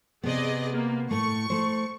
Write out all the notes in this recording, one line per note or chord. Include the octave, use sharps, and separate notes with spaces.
C3 B3 G#4 D5 D#5
A#3
A2 A3 C#6
A3 C5